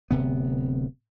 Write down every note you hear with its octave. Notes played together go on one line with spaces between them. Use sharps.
D1 C3 B3